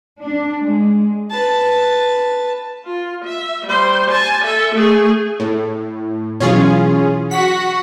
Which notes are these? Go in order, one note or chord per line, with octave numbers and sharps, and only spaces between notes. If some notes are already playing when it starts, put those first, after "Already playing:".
D4
G#3
B4 A5
F4
E5
G3 C5
G#5 A5
A4 E5
A3 G#4
A2
B2 E3 F#3 C#4 F4 G#4
F#4 F#5 B6